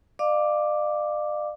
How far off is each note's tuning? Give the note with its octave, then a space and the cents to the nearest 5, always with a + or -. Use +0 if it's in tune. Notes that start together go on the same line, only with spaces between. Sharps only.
D5 +40 F5 +0 D6 +0